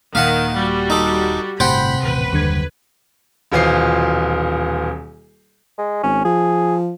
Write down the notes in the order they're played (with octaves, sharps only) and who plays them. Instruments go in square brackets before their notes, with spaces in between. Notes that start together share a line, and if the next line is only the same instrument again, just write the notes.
[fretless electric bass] D#1 A#2 A#3 [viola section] D#3 [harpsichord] F5 F#5
[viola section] G3 F#4
[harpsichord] D#4 A4
[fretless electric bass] G1 A2 [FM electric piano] C3 [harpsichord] C5 F#5 G5 [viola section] B5
[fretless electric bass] D#1 A1 [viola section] B4
[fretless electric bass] F#1 G3 [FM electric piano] D#2 D3 G#6
[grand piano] D#1 B2 E3 F4 C5 C7
[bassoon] G#3
[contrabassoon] G#1 [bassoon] C#4
[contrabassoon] F3 [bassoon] G#4